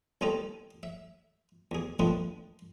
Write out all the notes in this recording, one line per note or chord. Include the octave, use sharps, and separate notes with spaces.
C2 B3 C4 D#4 A4 A#5
E5
E2 G#4
D3 F3 A3 B3 C4 D#4